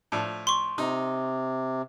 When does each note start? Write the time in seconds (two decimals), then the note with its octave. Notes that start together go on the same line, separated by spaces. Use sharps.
0.12 A2 F3 D4
0.47 C6 C#6
0.78 C3 D#4